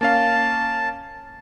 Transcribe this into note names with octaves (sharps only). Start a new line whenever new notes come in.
A#3 C#4 F5 A5